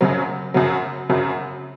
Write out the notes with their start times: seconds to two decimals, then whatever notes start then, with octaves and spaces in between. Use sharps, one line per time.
0.01 F#2 C#3 F#3
0.54 F#2 C#3 F#3
1.09 F#2 C#3 F#3